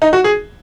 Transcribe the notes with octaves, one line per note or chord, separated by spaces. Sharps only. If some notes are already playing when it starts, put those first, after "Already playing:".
D#4
F#4
G#4